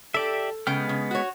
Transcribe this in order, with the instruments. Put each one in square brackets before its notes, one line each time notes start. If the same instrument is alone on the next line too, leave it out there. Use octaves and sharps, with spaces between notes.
[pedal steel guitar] G4 D5 E5 [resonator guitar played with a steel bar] A4
[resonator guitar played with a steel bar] C#3 G5 [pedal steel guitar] G#3 B3 F6
[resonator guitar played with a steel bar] C#3
F#4 C#5